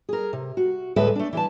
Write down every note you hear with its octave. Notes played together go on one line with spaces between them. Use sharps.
G#4 A#4
C3
F#4
D2 A2 G#3 A4 B4 E5
A3 D4
E3 B4 A5